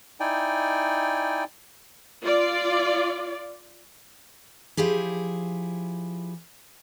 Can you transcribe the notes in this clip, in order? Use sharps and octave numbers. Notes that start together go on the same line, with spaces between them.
D#4 E4 D5 G5 G#5
F4 D5
F3 E4 G4 G#4